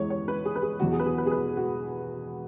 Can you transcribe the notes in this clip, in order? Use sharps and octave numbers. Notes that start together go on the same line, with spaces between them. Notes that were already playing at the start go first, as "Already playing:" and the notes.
Already playing: E2 E3 G#3 C#5
C#5
B4
G#4
B4
G#4
E1 E2 B2 F#3 F#4
G#4
B4
G#4
B4
G#4
B4
F#4